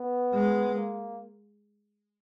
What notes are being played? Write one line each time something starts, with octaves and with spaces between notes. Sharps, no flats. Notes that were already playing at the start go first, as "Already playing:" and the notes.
Already playing: B3
G#3
A#3